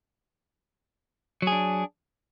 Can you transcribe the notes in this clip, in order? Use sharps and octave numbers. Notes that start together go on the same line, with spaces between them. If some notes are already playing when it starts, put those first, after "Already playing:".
F#3 D4 G#4